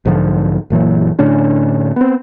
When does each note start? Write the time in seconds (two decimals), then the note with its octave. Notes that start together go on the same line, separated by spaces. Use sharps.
0.05 B1 G#2 D3 F3
0.70 F#1 A#2 E3 F#3
1.19 A2 D3 C#4 D4
1.96 B3 C4